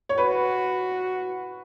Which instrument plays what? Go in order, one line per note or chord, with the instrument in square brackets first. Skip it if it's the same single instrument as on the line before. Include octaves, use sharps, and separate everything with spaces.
[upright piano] C#5
[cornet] F#4 [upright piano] B4